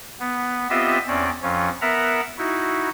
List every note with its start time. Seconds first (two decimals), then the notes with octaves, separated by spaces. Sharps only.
0.20 B3
0.70 B3 C4 F4 G4 D#5 E5
1.08 E2 C4 C#4 D5
1.42 F2 F3 C#4
1.81 B3 A#4 E5 F#5 A#5
2.38 D#4 E4 F#4